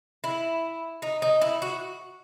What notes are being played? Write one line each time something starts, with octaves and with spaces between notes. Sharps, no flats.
E4
D#4
D#4
E4
F#4